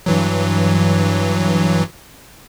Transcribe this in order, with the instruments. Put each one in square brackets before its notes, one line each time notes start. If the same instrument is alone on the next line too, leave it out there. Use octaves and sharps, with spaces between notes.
[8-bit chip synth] G2 E3 F#3